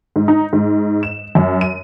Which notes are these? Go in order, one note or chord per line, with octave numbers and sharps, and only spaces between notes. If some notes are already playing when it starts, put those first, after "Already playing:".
G#2
D#4
G#2
E7
F#2
D#7